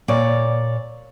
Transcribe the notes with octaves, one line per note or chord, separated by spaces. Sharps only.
A#2 C#5 D5